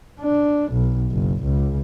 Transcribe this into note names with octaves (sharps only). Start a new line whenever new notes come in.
D4
B1
F#1
C#2